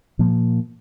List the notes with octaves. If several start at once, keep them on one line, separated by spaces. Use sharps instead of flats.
A#2 F3 A#3